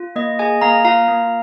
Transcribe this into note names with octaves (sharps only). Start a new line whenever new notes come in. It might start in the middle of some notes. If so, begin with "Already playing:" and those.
Already playing: F4
A#3 D#5
G#4 D#5 G#5
A#3 F5 A#5
F4 F5 A#5
A#3